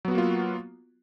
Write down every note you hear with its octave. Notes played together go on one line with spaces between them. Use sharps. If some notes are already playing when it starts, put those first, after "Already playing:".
F#3 A#3 B3 F4 F#4